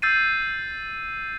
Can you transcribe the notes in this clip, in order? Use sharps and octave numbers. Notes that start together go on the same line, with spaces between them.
E6 G6 A6 C7 D#7